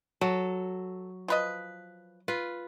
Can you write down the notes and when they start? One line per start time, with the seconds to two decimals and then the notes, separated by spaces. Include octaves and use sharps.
0.21 F#3 A4
1.28 F3 B4 D#5
2.28 F4 B4